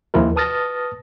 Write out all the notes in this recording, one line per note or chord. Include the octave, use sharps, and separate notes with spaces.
D#2 F3 E4 F4 A#4
B4 A5 D#6 F6 A6 A#6